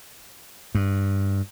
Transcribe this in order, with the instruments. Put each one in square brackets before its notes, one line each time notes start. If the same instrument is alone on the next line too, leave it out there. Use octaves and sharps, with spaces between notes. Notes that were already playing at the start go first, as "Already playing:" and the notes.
[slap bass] G2